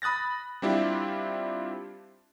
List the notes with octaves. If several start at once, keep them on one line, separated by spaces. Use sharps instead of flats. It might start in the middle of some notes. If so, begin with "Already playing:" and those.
B5 D#6 F#6 A6 A#6
G3 C4 D4 E4 F4 G4